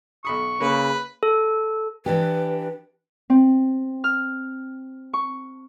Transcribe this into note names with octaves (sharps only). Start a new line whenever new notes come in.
B1 B5 C#6 D#6
C#3 A#3 B4
A4
E3 D4 G4 B4
C4
F6
C#6